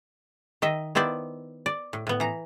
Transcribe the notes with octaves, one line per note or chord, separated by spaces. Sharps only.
D#3 D#5 E5
D#3 B3 E4 C5 D5
D5
A2
A2 B3
E3 A#5